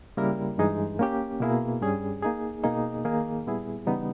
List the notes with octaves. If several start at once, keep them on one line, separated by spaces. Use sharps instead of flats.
C#3 G3 A#3 E4 A#4
G2 E3 G#3 D#4 G#4
A#3 C#4 G4
B2 A#3 E4 G#4
G2 G3 C#4 G#4
A#3 D#4 G#4
B2 A#3 D#4 G#4 D#5
D#3 A#3 D#4 G#4
A#2 G3 B3 E4 G#4
C#3 E3 G3 B3 D#4